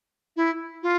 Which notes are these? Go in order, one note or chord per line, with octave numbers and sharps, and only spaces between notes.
E4
F4